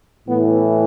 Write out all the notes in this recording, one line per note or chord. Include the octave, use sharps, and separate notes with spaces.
A2 E3 B3